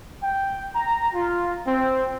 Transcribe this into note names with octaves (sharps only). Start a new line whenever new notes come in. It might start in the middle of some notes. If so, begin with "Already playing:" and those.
G5
A#5
F4
C4